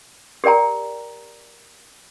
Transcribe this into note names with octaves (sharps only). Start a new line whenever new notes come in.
G4 A#4 D5 G5 A#5